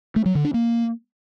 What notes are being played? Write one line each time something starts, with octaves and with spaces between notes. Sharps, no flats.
A3
F#3
D3
D4
A#3